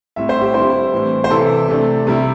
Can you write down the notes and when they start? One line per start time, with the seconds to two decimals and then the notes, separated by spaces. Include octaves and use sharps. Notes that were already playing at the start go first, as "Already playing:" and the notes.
0.16 A2 G3 C4 E5
0.29 C5
0.41 G4
0.54 D3 G3 C4 E4 C5
0.92 A2 E3 C4
1.24 C5
1.30 C3 E3 C4 E4 A4
1.69 C3 A3 D4
2.07 C3 G3 E4